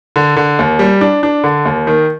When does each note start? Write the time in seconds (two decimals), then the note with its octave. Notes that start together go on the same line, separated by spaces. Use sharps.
0.16 D3
0.36 D3
0.59 D#2
0.79 G3
1.01 D4
1.23 D4
1.44 D3
1.65 D#2
1.87 D#3